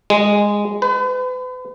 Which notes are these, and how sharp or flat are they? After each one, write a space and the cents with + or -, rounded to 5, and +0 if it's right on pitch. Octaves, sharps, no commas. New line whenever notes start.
G#3 -10
B4 +40